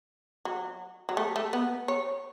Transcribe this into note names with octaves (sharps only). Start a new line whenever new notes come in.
F#3
F#3
A3
A3
B3
C#5